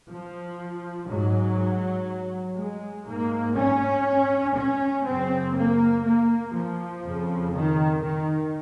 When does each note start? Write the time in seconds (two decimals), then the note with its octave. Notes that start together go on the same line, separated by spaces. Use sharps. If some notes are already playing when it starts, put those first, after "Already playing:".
0.09 F3
1.08 G#2 F#3
2.57 G#3
3.06 G#2 A#3
3.56 C#4
4.56 C#4
5.05 F#2 C#3 C4
5.55 A#3
6.05 A#3
6.54 F3
7.04 F2 C#3
7.53 D#3
8.03 D#3